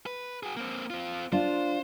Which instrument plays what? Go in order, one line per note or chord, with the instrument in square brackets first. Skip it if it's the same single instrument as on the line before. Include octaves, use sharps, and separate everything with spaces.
[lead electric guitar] B4
F#4 G#4
A#3 C4
C4 F4
[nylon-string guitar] D4 F4 [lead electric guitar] C5